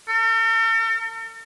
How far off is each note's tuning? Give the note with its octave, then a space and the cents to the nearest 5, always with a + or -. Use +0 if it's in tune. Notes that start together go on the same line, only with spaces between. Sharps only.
A4 +45